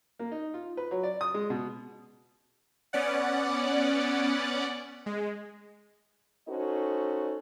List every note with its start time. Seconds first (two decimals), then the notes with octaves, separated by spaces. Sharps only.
0.19 A#3
0.32 D#4
0.54 F4
0.77 B4
0.91 F#3
1.03 D5
1.21 D#6
1.34 G#3
1.50 B2
2.93 B3 C#4 D5 F#5
5.06 G#3
6.48 C#4 D#4 F#4 A4 C5 D#5